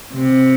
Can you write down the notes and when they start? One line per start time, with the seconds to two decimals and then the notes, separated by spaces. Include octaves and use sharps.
0.13 C3